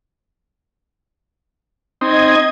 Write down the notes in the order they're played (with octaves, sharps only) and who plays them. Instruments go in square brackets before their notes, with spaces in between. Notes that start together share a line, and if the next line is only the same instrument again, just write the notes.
[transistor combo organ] C4 D#4 [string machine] D#5 G#6